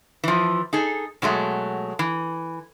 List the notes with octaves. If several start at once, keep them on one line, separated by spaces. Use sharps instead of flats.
E3 F3
D#4 G#4 A4
B2 F#3 G#3 A3
E3